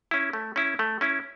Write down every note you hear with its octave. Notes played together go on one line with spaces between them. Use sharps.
C#4 E4
A3
C#4 E4
A3
C#4 E4